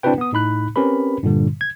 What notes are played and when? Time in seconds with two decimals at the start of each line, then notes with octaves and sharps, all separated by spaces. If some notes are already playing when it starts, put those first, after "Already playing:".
0.03 C4 D4 E4 F#4 B4 G5
0.18 B3 D#6
0.33 A2 D#4 B5 F#6
0.76 C4 C#4 G4 A#4 B4 B5
1.23 G2 A#2 D3 G3
1.61 G#6